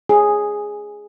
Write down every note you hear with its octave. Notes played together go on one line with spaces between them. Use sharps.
G#4